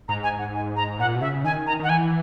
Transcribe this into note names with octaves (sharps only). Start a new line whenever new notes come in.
G#2 A#5
G#5
F#5
G#5
A#5
A#2 F#5
B2
C#3 E5
D#3 G#5
A#5
D#3 F#5
E3 G#5